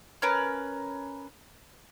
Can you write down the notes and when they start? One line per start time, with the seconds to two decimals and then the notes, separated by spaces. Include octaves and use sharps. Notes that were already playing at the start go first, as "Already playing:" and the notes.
0.22 C#4 A#4 B4